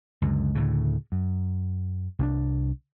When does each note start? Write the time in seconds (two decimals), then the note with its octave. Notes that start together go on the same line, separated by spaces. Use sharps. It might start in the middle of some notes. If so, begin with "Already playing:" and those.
0.22 C#2 F#2 D3
0.55 D2 A2 C#3
1.12 F#2
2.19 C2 C#4 D4